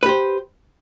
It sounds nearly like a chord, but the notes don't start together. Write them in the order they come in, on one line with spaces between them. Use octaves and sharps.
B4 G4 C5